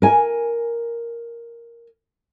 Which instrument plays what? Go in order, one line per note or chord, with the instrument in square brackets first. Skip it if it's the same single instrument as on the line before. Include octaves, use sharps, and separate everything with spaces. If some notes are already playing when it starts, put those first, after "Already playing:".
[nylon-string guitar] A#4 G#5